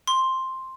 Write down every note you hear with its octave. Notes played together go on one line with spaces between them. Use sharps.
C6